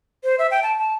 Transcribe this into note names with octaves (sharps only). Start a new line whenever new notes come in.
C5
E5
G5
A5
A5